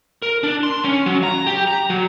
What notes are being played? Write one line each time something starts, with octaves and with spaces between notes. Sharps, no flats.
A#4
D4
C6
C#4
F#3
A#5
G4
A#5
F#3